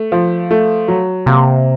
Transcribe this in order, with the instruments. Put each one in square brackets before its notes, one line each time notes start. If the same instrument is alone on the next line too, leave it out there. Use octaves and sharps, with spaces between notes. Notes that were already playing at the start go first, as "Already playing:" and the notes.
Already playing: [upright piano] A3
F3
A3
F#3
[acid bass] C3 [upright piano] A#3